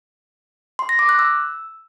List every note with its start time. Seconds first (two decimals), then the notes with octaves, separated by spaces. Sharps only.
0.79 C6
0.89 A#6
0.99 D6
1.09 F#6
1.19 E6